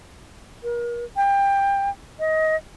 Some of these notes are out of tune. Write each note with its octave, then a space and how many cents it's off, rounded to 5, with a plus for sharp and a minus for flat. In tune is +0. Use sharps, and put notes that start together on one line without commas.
A#4 +35
G5 +20
D#5 +20